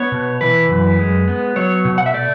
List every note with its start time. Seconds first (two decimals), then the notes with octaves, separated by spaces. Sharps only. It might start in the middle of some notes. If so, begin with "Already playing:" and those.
Already playing: B3 C#5
0.12 B2
0.41 E3 B4
0.70 F#2
0.99 G#3
1.28 B3
1.56 F#3 C#5
1.85 B2
1.98 F#5
2.06 E5
2.14 A3 D5